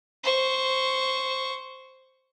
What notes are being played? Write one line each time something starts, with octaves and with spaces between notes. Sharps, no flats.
C5 C#6